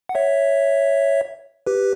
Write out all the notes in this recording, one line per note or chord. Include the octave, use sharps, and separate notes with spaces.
F#5
C#5 E5
G4 B4